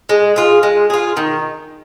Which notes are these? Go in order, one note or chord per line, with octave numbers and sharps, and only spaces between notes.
G#3
F4 G#4
G#3
F4 G#4
D#3